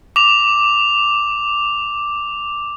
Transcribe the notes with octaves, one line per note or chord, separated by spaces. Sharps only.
D6 F7